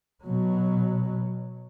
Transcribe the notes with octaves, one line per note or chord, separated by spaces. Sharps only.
B2 F#3